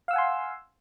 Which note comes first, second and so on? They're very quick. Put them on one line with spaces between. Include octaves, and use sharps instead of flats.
F5 E6 F#5 G#5 C6